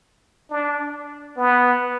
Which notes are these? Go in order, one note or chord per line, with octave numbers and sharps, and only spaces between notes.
D4
B3